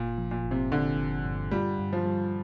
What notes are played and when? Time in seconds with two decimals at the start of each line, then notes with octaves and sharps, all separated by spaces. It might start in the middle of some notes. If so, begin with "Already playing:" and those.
Already playing: G1 A#2
0.18 F3
0.31 A#2
0.45 G1
0.51 C3
0.71 G1 D3
0.98 G1
1.25 G2
1.51 G3 F4
1.79 G2
1.93 F3
2.06 G3